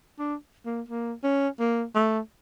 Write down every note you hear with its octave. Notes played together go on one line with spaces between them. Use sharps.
D4
A#3
A#3
C#4
A#3
A3